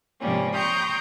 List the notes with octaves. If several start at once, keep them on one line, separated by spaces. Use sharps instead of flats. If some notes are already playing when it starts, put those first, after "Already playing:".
G#2 C3 F3 G3 A#3 C#4
G5 A#5 C6 C#6 D#6 G6